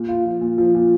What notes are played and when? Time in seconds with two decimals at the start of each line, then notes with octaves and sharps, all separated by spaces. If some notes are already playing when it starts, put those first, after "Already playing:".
Already playing: A#2
0.09 F4
0.25 F3
0.41 A#2
0.58 F3
0.75 A#2